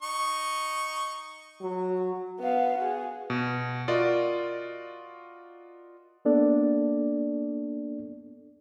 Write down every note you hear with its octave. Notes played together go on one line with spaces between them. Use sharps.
D#4 C#6
F#3
B3 F5
F#4 G#4
B2
F4 F#4 A#4 D5 D#5
A#3 B3 D4 A4 D5